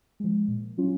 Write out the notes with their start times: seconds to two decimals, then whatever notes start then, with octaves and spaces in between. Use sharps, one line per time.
0.20 F3 G#3
0.48 A#2
0.78 F#3 C#4 F4